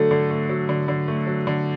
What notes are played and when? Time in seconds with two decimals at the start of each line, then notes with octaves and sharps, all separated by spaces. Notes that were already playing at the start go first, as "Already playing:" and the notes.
Already playing: D3 F#3 A3 A4
0.11 D3
0.30 A3
0.49 F#3
0.69 D3
0.88 D3
1.08 A3
1.27 F#3
1.47 D3